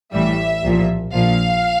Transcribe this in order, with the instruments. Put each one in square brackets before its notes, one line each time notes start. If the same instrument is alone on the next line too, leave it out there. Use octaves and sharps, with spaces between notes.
[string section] A1 A2 E3 G3 E5
C2 A#2 F3
A#1 A#2 F3 F5